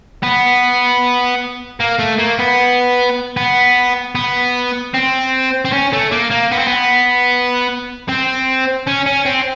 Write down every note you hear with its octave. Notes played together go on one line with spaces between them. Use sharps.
B3
A#3
A3
A#3
B3
B3
B3
C4
C4
C#4
A3
A#3
A#3
B3
C4
B3
C4
C#4
C#4
C4